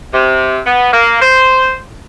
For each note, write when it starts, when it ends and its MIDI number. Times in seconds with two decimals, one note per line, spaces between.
0.13 0.59 48
0.65 0.90 59
0.93 1.21 58
1.22 1.77 72